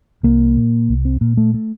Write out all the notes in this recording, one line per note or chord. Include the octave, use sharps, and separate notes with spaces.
C2 A#3
A#2
C2
C4
A#2 A#3
A3
A3